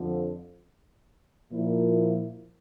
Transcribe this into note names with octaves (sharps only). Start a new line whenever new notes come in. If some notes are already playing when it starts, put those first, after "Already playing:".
Already playing: F2 D3 F3
A#2 F3 A#3 E4